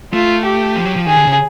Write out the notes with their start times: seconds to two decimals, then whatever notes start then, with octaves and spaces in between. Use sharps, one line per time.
0.13 A3 F4
0.45 G4
0.76 F3
0.85 F#3
0.96 F3
1.06 D#3 G#4
1.17 D3
1.27 C#3